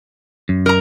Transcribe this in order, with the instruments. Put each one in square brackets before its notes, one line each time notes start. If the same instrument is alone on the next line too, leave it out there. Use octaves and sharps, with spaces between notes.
[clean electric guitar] F#2
[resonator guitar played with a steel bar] A#4 A#5